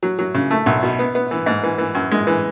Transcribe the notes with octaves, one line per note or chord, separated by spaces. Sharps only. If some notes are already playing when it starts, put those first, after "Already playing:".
F#3
F#3
C#3
A3
B1
B2
B3
B3
E3
G#2
E3
E3
F#2
G#3
E3